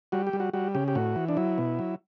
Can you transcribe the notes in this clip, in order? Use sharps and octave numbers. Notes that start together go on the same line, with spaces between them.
G3 F#4
G4
G3
F#4
G3 F#4
C#3 G4
G4
A2 F#4
E3
D4
F#3 E4
B2
F#3